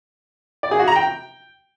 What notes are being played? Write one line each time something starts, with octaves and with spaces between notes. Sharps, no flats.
D5
G#4
F#4
A#5
G5